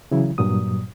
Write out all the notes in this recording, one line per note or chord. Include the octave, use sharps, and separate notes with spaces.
C#3 E3 F#3 E4
G2 A#2 F#3 D#6